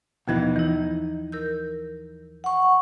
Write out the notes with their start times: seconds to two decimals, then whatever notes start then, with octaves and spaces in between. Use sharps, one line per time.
0.28 D#2 B2 E3 F3 D#4 F#6
0.56 E3 D#4 E4
1.32 A#4 E6 G6
2.44 F#5 C#6